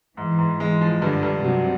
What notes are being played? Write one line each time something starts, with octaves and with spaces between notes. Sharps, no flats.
G#2 E3
G#2
G#3
F3
G2 D3
G2
C3 F#3